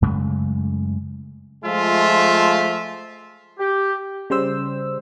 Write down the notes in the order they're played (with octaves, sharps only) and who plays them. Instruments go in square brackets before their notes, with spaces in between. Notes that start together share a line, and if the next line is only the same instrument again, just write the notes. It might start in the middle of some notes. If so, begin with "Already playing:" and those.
[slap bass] F#2 C#3 G#3 A3
[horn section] F3 G#3 A3 F4 E5
[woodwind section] G4
[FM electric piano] C#3 G3 C5 E6